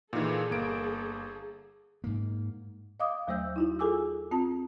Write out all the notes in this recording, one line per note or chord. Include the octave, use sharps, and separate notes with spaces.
A#2 D#3 E3 G#4 A4
G1 A#3 D7
G#2 A#3
D#5 F5 D6 D#6
D#2 F#3 A3 C5 E6 G6
D#4 E4 F#4
F4 G#4 A4 G#5 D6 E6
C4 F4 A5